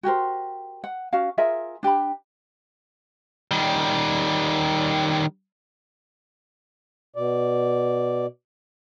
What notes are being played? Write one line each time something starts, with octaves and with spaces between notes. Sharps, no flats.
F#4 G4 A#4 C5
F#5
C#4 F#4 F5
F4 G#4 A#4 E5
D4 G4 G5 B5
D#3 G3
B2 D5